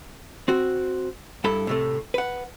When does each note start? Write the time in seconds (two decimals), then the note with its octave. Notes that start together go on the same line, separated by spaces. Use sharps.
0.48 C4 F#4
1.44 G2 E4 A4 B5
1.67 A2 C3 A3
2.14 B4 F#5